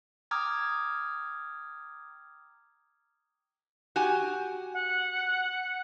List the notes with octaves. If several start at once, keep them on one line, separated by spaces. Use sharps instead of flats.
G5 A#5 D6 D#6 F6 G#6
F#4 G4 G#5
F#5